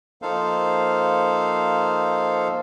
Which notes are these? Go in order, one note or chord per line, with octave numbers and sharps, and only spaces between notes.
F3 A#3 D#4 A4 C5 F5